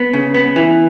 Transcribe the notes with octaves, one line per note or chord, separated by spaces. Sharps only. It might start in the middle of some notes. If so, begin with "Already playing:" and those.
Already playing: B3
C#3
B3
E3